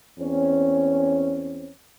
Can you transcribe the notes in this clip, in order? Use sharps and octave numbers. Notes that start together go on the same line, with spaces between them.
E2 C4 C#4